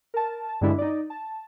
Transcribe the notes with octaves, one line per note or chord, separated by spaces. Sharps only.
A#4 A5
A5
G2 D3 G#3 D4 E4
D#4 D5
A5